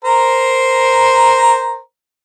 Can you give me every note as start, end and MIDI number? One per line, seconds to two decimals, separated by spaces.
0.05 1.79 70
0.05 1.79 72
0.05 1.79 82